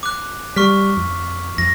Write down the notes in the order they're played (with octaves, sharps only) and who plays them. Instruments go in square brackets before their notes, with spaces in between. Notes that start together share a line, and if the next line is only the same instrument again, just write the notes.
[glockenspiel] D6 F#6
[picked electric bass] G3 [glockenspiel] C#6 F6 B6
[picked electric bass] F2
[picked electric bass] F2 [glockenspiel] A#6